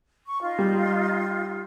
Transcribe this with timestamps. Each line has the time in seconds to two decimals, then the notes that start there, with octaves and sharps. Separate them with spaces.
0.27 C#6
0.41 D#4 F4
0.59 G3